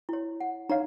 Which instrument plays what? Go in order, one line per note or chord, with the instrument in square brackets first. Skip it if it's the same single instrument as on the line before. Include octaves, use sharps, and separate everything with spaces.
[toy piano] E4 C#5
F#5
[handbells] D#4 C#5 F5 [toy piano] A#5